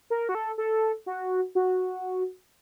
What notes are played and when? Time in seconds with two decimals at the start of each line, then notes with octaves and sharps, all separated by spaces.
0.10 A#4
0.29 F#4
0.35 A4
0.58 A4
1.06 F#4
1.55 F#4